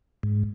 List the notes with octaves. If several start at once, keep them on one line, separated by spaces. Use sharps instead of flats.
G#2